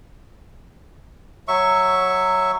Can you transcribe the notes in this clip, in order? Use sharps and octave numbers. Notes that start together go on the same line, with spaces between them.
F#3 E5 C#6